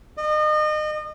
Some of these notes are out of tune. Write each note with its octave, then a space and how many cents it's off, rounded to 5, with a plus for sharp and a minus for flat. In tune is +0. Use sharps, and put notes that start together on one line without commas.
D#5 -35